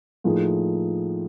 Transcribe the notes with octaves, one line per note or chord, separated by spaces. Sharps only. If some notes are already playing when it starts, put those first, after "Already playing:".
A2 F3 A#3 D#4 G#4